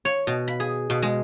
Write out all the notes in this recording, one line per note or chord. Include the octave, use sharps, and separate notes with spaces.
C#5
B2
B5
G#4
B2
G#3